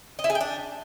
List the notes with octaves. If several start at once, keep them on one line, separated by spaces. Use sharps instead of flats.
D#5
E4
G#4
G5
D4